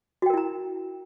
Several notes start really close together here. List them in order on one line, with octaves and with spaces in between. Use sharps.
F#4 G5 A#4 E4 A#5